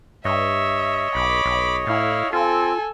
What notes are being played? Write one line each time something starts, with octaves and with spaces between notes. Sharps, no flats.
G2 C#5 D#5 E5
B1 B5 D6
B1
A2 E4 F5
C4 F4 A4 G#5